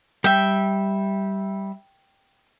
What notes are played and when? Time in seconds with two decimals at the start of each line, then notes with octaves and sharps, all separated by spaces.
0.24 G3 E5 G5